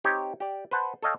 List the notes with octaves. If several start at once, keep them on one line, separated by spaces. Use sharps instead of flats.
C4 D#4 G4 C#5
G4 D5
B4 C5 F#5 A5
A4 C#5 D#5 F5 G5